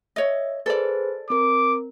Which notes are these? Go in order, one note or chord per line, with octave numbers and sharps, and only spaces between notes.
C#5 D#5 E5
G#4 A4 B4 C5 D5
C4 A#4 D6